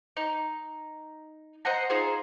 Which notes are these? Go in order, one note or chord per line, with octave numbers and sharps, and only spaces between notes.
D#4
C5 D#5 F#5 A#5
D#4 F4 G#4 C5